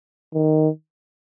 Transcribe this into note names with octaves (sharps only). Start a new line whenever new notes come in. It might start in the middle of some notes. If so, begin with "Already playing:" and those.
D#3